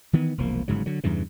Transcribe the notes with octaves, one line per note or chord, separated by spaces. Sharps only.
D#3 E3 B3
E1 C2 F3 A#3
G1 G#2 C#3 F#3
D3 F#3
E2 G2 C#3 E3